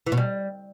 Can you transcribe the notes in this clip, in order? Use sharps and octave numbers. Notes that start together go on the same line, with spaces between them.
E3
B2
G3